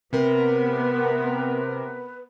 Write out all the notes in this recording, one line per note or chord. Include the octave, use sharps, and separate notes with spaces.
C3 B3 A#4 B4